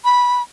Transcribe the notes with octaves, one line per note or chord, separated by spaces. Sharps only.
B5